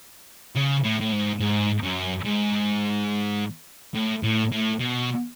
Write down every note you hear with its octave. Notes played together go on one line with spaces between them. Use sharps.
C#3
A2
A2
G#2
G#2
F#2
G#2
A2
A2
A2
B2